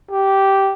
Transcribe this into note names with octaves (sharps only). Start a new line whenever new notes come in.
G4